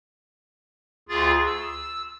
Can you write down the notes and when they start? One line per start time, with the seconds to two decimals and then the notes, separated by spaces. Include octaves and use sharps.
1.09 D2 F4 G#4 A6
1.46 E6